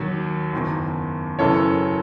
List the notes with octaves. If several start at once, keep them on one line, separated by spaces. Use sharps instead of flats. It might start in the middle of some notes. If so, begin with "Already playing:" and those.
Already playing: D#2 D#3 F#3
F#1 E2 D#3
F#1 F#2 C#3 E3 A4 C#5